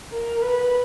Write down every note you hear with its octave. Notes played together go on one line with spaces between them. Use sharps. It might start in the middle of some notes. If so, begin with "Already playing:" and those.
A#4
B4